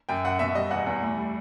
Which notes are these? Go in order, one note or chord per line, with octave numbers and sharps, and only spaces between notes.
F#2 G5
F#2 F#5
B2 E5
G3 D#5
E2 F#5
E2
A2
G3